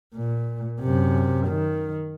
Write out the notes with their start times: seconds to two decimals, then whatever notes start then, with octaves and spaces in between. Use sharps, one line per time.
0.14 A#2
0.80 F#2 C3
1.47 D#3